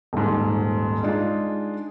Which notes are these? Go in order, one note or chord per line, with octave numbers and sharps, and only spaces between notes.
D#1 G#2
G#3 D4 D#4 F4 G#4